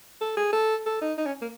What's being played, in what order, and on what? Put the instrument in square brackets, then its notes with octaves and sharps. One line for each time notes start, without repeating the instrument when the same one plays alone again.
[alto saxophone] A4
G#4
A4
A4
D#4
D#4
C#4
A#3